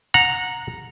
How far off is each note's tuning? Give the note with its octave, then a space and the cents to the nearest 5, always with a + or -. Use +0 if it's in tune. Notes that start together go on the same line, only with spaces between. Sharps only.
F#5 -20 A#5 +0